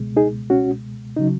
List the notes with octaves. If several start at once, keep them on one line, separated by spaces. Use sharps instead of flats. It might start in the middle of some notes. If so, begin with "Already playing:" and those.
Already playing: C#2 B2 G#3
D#4 G#4
C#4 F#4
C#3 F#3 D#4